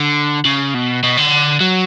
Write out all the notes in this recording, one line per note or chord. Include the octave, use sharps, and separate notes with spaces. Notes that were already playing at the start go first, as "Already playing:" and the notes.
Already playing: D3
C#3
B2
B2
D3
F#3